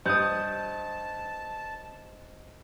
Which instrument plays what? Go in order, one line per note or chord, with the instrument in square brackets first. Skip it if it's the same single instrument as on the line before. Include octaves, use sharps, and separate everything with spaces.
[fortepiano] G2 [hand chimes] C5 D#5 [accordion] A5 [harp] D#6 G6